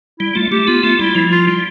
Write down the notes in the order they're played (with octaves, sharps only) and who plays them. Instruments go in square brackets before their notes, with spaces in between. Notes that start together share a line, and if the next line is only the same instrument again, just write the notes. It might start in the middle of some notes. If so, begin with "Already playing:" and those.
[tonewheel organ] G3 [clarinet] E4
[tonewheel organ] A3 [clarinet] F4
[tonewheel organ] A3 [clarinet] G4
[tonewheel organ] B3 [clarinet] F4
[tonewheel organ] A3 [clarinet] F4
[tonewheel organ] G3 [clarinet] E4
[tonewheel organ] F3 [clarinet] E4
[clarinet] F4
[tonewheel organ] G3 [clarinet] F4